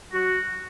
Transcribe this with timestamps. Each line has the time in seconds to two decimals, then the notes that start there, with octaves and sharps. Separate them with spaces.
0.12 F#3 F#4